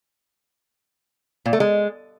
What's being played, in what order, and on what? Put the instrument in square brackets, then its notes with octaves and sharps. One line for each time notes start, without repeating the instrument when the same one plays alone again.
[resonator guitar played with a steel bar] A#2
A3
G#3